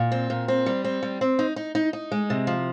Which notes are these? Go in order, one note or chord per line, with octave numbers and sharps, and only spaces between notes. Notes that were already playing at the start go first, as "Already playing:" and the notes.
Already playing: A#2
C4
A#2
C4
G3
C4
G3
C4
D#4
D#4
D#4
D#4
G#3
C3
F3